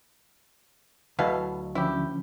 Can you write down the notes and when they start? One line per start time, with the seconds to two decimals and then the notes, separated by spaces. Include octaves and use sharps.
1.19 D2 B2 F#3 E4 A4 F5
1.75 D3 F3 C#4 E4 G4